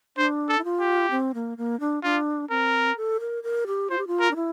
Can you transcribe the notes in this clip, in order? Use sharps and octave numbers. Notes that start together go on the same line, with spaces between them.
D4 C5
A4
E4
F4
G4
C4
A#3
A#3
D4
D4 F4
C4 A#4
A4
A#4
A#4
G4
F4 C5
G4
F4
A#4
D4
E4